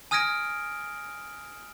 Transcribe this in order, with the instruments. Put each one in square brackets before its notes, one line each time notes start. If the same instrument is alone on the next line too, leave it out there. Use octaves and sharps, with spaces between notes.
[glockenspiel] G#5 D#6 F6 G#6 A#6 D7